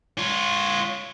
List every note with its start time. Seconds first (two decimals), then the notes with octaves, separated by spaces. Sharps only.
0.18 F4 C#5